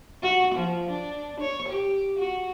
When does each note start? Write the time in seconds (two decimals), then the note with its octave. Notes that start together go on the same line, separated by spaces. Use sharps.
0.23 F#4
0.55 F3
0.89 D4
1.40 C#5
1.68 G4
2.19 F#4